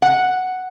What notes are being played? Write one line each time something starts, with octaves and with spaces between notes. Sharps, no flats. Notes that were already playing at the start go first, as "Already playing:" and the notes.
F#5